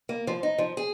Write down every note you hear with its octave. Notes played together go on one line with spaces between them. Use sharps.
A#3
F3
D#4
F3
G#4